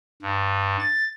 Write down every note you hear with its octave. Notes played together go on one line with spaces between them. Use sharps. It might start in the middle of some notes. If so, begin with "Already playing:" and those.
G2
A6